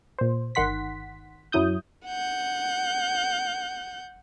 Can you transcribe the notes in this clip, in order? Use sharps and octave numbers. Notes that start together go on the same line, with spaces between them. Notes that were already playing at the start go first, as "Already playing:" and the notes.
A#2 C5
G1 D#3 F#5 C6 B6
F#2 F#3 E4 D#6 G6
F#5 G6